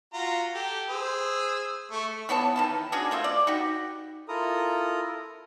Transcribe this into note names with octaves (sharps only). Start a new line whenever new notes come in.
F4 F#4 A#5
G4 A4
G#4 C5 E6
A3 C#6
E3 B3 C#5 A5
D#3 E3 A5
C#4 D4 F#4 G#4
A3 A#3 F4 E5
D5
D#4 F#4 G4
E4 F4 A4 A#4 A#5 D#6